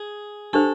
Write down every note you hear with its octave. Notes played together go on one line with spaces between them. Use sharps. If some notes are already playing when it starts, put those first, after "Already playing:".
Already playing: G#4
D4 G4 A4 C5